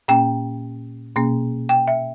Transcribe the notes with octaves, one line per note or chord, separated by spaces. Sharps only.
A#2 A#3 C#4 G5
B2 A#3 C#4
G5
E5